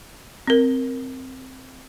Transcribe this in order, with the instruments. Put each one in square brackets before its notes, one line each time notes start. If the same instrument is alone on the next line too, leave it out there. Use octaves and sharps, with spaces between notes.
[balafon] C4 A#4